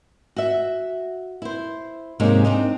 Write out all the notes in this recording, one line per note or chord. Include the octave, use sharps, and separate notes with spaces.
F#4 E5
E4 C5
G#2 C3 G#3 A#3 C#4 D#4
C4 D4 D#4